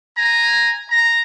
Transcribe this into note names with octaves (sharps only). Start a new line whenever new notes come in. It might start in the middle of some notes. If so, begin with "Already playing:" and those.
G#5 A#5
A#5